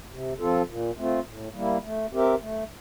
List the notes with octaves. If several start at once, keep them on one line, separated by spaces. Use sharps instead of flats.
C3
F3 C4 F4 A4
A#2
A3 C4 F4
A2
G3 A#3 E4
A3
C4 G4 A#4 E5
A3